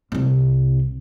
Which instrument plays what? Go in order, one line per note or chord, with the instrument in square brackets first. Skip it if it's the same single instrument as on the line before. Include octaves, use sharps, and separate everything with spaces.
[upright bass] C2 C3